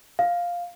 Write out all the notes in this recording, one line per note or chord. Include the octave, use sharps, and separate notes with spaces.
F5